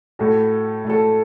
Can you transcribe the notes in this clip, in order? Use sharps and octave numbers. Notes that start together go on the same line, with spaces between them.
A2 A3 F#4 A4
A2 A3 F#4 A4